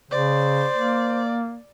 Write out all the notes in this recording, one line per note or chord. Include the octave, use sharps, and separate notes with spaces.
C#3 C5 D5
A#3